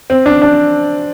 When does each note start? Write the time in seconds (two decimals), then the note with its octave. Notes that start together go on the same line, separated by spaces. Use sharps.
0.10 C4
0.26 D4
0.42 D4